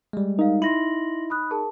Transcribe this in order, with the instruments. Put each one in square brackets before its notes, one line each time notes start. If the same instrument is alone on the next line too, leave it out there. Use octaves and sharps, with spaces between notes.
[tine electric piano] G3 G#3
[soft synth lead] D#4 [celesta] A#4 F5
[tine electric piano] E4 [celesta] C6 A#6 F#7
[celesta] B5 D#6 F#6
G#4 A#4 A5